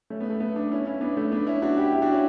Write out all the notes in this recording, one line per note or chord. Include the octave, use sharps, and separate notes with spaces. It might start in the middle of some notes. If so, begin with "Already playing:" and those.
A3 C#4
B3
A3
B3
B3 D4
C#4 E4
C#4 E4
B3 D4
A3 C#4
B3 D4
C#4 E4
D4 F#4
E4 G4
E4 G4
D4 F#4
C#4 E4